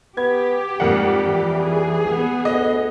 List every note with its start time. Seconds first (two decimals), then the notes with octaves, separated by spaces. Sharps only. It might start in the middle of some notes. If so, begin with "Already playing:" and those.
0.17 B3 G4 G#6
0.80 F2 G#2 G3 A#3 F#5
1.29 E3
1.62 G#4
2.09 B3
2.45 D2 D#5